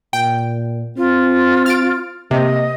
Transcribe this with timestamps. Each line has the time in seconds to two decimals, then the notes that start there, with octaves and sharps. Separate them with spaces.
0.13 A#2 G5
0.97 C4 F4
1.66 F6 A6 D7
2.31 C3 A#3 D#5